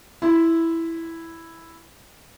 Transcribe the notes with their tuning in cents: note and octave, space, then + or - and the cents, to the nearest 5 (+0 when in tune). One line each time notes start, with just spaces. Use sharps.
E4 +0 C6 -15